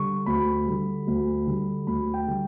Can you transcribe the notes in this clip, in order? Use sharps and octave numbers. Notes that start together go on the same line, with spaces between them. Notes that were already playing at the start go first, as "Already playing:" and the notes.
Already playing: D3 G3 C#6
D2 B5
D3 G3
D2
D3 G3
D2 B5
G5
D3 G3